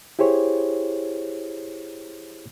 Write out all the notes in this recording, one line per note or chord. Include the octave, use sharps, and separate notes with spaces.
E4 G4 G#4 C5 C#5